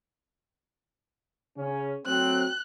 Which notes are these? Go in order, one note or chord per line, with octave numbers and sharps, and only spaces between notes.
C#3 C#4
F#3 A3 C4 F#6